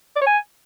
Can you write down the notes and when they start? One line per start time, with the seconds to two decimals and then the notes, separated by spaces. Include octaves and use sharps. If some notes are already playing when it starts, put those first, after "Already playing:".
0.16 D5
0.21 C#5
0.27 G#5